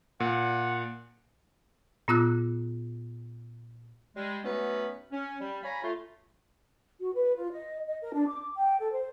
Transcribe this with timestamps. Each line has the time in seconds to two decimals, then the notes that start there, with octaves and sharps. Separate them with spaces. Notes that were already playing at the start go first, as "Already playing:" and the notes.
0.20 A#2 F#5
2.08 A#2 B3 F4 D6 E6 F#6
4.16 G3 G#3
4.43 F#3 A3 B3 C#4 D#4 B4
5.12 C#4
5.39 G3
5.63 C#5 F5 G#5 A#5 B5
5.82 A3 F4
7.00 F#4
7.14 B4
7.36 F4
7.52 D#5
7.87 D#5
8.01 A#4
8.14 D4
8.28 D6
8.56 G5
8.79 A4
8.92 C5